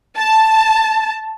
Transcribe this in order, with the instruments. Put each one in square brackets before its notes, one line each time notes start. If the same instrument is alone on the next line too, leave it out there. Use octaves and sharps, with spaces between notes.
[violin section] A5